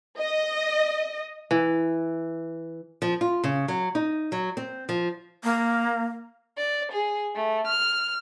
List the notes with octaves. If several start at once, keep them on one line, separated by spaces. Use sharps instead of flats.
D#5
E3
F3
F4
C#3
F#3
D#4
F#3
C4
F3
A#3
D5
G#4
A3
F6